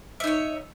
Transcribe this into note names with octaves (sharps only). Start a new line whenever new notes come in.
D#4 C#5 E5